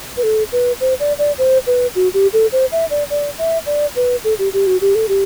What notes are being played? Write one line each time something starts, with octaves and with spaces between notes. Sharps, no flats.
B4
A4
B4
C5
D5
D5
C5
B4
F#4
G4
A4
C5
E5
D5
D5
E5
D5
B4
A4
G4
G4
F#4
G4
A4
G4